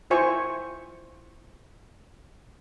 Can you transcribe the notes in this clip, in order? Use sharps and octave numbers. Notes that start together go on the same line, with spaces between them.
E4 F4 C5 G#5 C#6